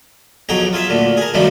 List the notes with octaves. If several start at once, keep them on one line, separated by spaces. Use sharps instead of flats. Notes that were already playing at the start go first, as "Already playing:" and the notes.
B1 F2 F#3 G#4 G5 A#5
F4 G#4 E5
D2 A#2 D3
G#4 A#4
F#2 C3 D#3 F3 G3 A3